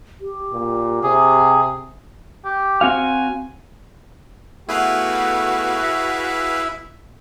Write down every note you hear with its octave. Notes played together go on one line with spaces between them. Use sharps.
G4
A#2
C3 G#4
G4
C4 F#4 F5 G#5
A3 B3 E4 F#4 G#4 B4 F5
E5